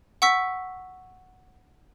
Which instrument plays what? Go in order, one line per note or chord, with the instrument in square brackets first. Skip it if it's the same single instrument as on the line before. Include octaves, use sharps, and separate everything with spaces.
[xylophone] F#5 C#6 E6 B6